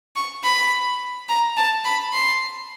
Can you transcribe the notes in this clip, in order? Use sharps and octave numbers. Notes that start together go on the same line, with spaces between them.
C#6
B5
A#5
A5
B5
C6